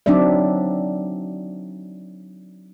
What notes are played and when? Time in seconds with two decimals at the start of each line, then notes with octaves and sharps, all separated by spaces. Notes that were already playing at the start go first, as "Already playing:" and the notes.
0.06 F#3 C4 D4 D#4 D5 E5